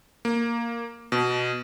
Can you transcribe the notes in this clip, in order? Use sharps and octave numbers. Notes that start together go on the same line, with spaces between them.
A#3
B2